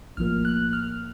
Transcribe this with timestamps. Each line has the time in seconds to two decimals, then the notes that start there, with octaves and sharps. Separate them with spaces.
0.17 A#1 A2 F3 A#3 F6
0.45 F#6
0.73 F6